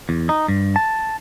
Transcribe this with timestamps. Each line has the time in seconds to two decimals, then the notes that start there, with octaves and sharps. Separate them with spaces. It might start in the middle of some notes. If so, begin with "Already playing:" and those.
0.09 E2
0.29 D#4
0.48 G2
0.76 A5